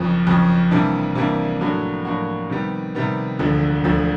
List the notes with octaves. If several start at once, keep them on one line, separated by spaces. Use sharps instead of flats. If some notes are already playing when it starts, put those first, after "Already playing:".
Already playing: F#1 F2 C#3 F3
F#1 F2 C#3 F3
C3 E3 G3 A#3 D4
C3 E3 G3 A#3 D4
A2 F#3 A#3 D4 F#4
A2 F#3 A#3 D4 F#4
C3 D#3 G3 B3
C3 D#3 G3 B3
E1 D2 D3 F3
E1 D2 D3 F3